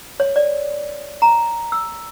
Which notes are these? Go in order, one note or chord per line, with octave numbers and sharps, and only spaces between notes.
C#5
D5
A#5
E6